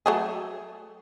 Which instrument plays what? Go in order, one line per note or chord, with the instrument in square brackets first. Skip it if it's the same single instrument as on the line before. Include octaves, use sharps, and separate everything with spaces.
[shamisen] F#3 A3 G#4